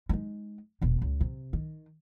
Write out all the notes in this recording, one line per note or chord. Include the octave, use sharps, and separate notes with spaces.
G#3 D#4
E1 B2
C#2
C3
D#3